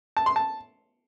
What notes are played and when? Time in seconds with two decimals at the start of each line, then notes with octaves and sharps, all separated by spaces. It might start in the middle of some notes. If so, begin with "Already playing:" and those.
0.17 A5
0.26 C6
0.36 A5